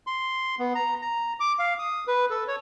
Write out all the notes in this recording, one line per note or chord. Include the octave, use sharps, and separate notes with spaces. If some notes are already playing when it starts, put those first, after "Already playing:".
C6
B3
A#5
A#5
D6
F5
D#6
B4
A4
C#5